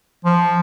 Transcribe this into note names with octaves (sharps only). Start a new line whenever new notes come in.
F3